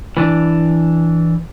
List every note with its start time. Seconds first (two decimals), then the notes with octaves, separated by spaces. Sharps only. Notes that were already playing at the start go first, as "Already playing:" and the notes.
0.17 E3 D4